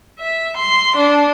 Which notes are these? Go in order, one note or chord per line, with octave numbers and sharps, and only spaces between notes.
E5
C6
D4